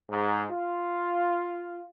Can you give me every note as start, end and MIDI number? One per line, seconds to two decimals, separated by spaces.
0.10 0.45 44
0.51 1.83 65